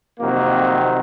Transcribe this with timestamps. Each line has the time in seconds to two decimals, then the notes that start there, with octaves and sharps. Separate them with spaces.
0.20 F2 C3 D#3 F#3 A#3